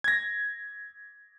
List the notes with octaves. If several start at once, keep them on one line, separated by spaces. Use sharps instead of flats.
G#6 A#6